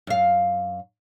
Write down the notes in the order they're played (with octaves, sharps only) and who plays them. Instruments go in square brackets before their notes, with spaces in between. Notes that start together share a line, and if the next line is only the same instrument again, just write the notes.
[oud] F#2 F5